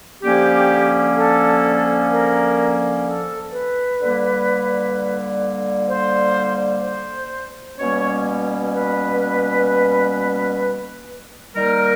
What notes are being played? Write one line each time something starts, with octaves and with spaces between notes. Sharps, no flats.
D3 F3 A#3 C#4 G4
A4
A#4
A4
B4
D3 G3 A#3
C5
C5
B2 G3 A#3 C#4 C#5
B4
D#3 G3 A#3 A#4